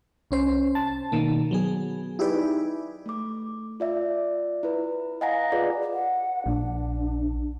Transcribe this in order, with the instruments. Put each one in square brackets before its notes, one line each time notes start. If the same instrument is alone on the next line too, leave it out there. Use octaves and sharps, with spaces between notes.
[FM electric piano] C2 C#4 C5
A5
B2 D#3 A#3
F#3 B3 G#4
D#4 E4 G4 G#4 B4 D5
[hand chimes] A3 D6
F4 D5 E5
E4 B4
D#5 F5 F#5 G#5 A#5 A#6
F4 G#4 B4 D5
[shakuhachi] F#5
[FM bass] A#1 [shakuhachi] D4